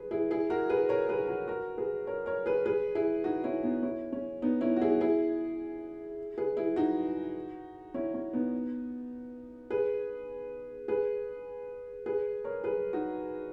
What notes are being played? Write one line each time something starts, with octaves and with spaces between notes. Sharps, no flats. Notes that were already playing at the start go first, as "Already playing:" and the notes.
Already playing: G#4 B4
E4 G#4
E4 G#4
F#4 A#4
G#4 B4
A#4 C#5
G#4 B4
F#4 A#4
F#4 A#4
G#4 B4
A#4 C#5
A#4 C#5
G#4 B4
G#4 B4
E4 G#4
D#4 F#4
C#4 E4
B3 D#4
C#4 E4
C#4
B3 D#4
C#4 E4
F#4
E4 G#4
E4 G#4
G#4 B4
E4 G#4
D#4 F#4
C#4 E4
C#4
B3 D#4
G#4 B4
G#4 B4
G#4 B4
A#4 C#5
G#4 B4
D#4 F#4